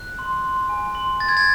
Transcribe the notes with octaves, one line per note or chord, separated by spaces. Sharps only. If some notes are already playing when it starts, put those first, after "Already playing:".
Already playing: F#6
C6
C6
G#5
C6
C6 A6
G#6
A6